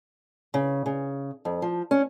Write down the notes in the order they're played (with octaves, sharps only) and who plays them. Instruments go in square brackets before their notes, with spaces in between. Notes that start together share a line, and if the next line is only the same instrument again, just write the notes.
[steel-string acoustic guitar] C#3
C#3
F2
F3
C#4